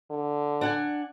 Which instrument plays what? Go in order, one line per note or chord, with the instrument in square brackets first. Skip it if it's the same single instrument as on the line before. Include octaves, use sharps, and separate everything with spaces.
[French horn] D3
[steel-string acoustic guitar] D4 F#5 G#5